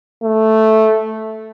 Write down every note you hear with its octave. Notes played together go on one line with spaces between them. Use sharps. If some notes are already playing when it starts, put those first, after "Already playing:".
A3